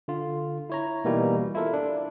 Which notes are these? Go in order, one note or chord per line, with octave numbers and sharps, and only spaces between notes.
D3 F4
E4 C#5 A#5
B2 E3 G3 A#3 D#4
E4 F4 A4 A#4
D4